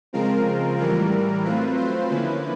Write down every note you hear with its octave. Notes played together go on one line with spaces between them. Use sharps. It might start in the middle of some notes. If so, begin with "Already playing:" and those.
C#3 F3 G#3 C4 F4 A#4
A2 E3 G3 A#4
F#3 A3 C4 F4 B4
C5
D3 F3 A#3 C#4 E4 B4